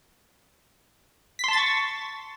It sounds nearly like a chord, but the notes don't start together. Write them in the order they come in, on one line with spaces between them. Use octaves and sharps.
B6 C6 A5 A6 C#6